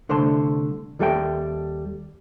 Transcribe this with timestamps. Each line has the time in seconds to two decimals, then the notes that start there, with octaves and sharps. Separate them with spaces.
0.09 C2 D3 A3 C5 A5 C6
0.99 D#2 G3 A4 E5 G5